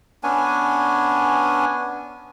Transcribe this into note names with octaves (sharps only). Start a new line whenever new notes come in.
B3 C#4 D4 G#5